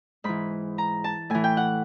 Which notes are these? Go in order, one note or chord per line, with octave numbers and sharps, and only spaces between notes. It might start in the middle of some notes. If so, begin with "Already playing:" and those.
G#2 E3 B5
A#5
A5
A2 E3 G#5
G5
F#5